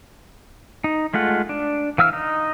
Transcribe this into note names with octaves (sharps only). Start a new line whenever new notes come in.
D#4
G#3 A3 F4 F#5
D4
E3 F5 E6 F6
D#4